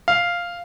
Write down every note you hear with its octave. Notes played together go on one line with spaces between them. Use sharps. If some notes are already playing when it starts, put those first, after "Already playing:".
F5